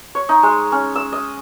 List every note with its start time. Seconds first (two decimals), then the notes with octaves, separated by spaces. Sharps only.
0.15 C#5
0.29 D#4
0.43 G#3
0.72 C#4
0.96 E6
1.13 D#5